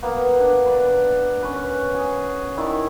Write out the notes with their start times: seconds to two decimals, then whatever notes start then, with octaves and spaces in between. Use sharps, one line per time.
0.02 A#3 B3
0.40 D4
0.66 B4 D5
1.42 C#4 B4
1.95 G#4
2.57 D#3 E4 D5